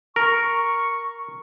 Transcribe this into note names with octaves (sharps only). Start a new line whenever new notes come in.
A#4 C#6